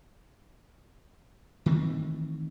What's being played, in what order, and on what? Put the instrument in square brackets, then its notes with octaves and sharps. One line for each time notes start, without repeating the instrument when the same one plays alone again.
[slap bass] D#3 E3 A3 C4